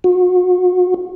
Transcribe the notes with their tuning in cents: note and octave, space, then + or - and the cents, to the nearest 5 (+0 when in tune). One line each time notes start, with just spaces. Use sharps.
F#4 -35